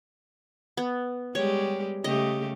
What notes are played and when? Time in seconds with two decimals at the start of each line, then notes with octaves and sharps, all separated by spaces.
0.77 B3
1.35 G3 G#3 G4 C#5
2.04 C#3 A3 G4 D#5